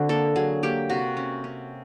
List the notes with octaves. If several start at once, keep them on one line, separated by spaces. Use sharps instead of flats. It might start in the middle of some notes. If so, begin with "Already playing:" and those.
Already playing: D3 C4 F#4
A#3 A4
F#3 G#4
A#3 G4
C3 F#4
C#4
C#4